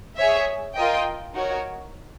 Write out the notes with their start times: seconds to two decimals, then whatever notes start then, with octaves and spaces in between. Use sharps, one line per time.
0.17 G#4 C#5 E5
0.76 F4 A#4 D#5 G5
1.34 D#4 F#4 A#4 C#5